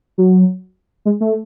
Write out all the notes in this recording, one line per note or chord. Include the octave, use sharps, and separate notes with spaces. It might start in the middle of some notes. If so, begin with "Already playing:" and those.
F#3
G#3
A3